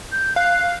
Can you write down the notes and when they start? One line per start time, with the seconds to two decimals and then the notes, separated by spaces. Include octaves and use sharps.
0.12 G6
0.36 F5 F#6